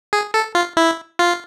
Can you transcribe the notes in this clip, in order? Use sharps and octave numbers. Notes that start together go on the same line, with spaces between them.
G#4
A4
F4
E4
F4